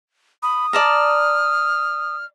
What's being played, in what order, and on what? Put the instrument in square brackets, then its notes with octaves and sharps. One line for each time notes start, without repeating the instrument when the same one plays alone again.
[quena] B5 [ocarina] D#6
[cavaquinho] D5 A5 A#5 [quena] F6